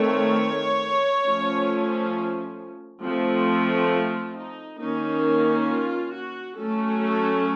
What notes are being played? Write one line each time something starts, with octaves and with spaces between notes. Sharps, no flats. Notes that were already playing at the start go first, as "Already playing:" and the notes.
Already playing: D#3 A3 C4 C#5
F3 A3 C#4
F3 A3 C4
F4
D#4
D#3 A#3 C#4 D#4
F4
F#4
F#3 A3 C#4 A4
A4